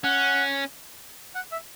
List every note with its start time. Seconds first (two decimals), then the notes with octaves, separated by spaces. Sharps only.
0.04 C#4 F#5
1.35 F#5
1.52 E5